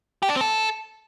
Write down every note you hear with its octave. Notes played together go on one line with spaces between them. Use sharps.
G4
D4
C4
A4